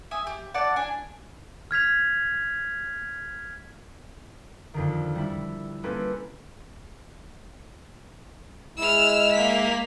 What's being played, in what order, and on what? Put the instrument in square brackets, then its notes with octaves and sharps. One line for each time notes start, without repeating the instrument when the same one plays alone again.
[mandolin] E5 G#5 D#6
G4
E4 D5 F#5 A5
D4 G#5
[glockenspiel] F6 G#6 B6 F7
[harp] F2 D3 D#3
G3 E4
A#3 C4 C#4 G4 A4 B4
[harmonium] G#3 E4 [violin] E6 F6
[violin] A#3 B6